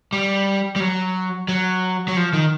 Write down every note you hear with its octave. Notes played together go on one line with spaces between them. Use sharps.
G3
G3
F#3
F#3
F#3
F3
D#3